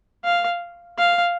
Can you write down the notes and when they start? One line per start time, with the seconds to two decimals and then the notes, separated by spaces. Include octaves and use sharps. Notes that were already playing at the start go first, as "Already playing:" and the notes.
0.24 F5
0.98 F5